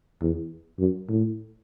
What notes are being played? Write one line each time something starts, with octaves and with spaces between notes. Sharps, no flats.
E2
F#2
A2